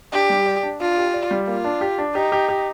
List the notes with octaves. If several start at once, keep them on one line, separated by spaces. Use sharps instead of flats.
D4 G4
G3
D5
D4
D4 F4
G4
D5
G3
A#3 F4
D4
G4
D4
D#4 G4
G4
G4